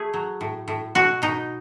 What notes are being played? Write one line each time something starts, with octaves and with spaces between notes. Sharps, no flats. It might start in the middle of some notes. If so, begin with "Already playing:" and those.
Already playing: A3 G#4
F#3
A2
A2
B2 F#4
B2 D#4